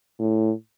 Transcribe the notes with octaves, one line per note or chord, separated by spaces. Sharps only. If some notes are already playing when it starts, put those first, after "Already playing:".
A2